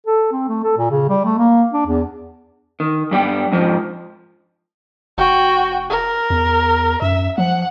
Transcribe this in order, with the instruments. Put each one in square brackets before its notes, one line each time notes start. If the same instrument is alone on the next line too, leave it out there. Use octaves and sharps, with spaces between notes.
[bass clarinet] A4
C4
A3
A4
A#2
C#3
G3
A3
A#3
D4
E2
[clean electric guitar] D#3
G2 G3 B3 G4
F2 G#2 F3
[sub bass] F1 [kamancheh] F#4 G5
[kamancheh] A#4
[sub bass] E2
[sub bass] F#2 [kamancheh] E5
[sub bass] F3 [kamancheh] F#5